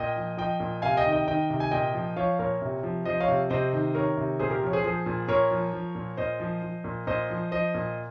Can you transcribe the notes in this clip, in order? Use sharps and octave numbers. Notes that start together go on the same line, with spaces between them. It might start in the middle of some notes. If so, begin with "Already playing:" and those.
Already playing: A#2 D#5 G5
F3
F3 D#5 G5
A#2
C3 F5 G#5
D#5 G5
D#3
D#5 G5
D#3 D#5 G5
C3
G#5
A#2 D#5 G5
F3
F3 C#5 F5
A#2 A#4 C#5
C3
F3
F3 C5 D#5
C#5 F5
C3
C3 C5 D#5
D#3
D#3 A#4 C#5
C3
A#2 G#4 C5
G4 A#4
F3 C#5
G#4 C5
F3 G#4 C5
A#2
A#2 A#4 C#5
F3
F3
A#2
A#2 C5 D#5
F3
F3
A#2
A#2 C5 D#5
F3
F3 C5 D#5
A#2